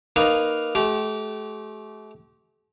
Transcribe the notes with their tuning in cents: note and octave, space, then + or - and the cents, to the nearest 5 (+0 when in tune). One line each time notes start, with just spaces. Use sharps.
A#3 +0 D#4 -10 B4 +5
A3 -40 G4 -30